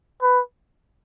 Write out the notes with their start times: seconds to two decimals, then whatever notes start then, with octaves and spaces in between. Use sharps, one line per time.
0.22 B4